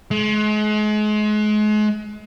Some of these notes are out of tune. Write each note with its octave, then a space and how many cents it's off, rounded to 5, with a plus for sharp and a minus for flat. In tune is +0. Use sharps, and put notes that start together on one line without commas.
G#3 +35